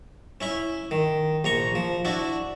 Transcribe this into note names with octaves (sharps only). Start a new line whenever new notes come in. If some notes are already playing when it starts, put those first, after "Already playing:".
C#4 E4 B5
D#3
A#1 A#5 C#6
F3
D4 E4 F#4